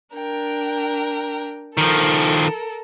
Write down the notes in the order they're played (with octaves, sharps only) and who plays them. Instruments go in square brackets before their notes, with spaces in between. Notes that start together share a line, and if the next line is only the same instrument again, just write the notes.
[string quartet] D4 A#4 G5
[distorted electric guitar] D#3 F3 [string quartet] A4 A#4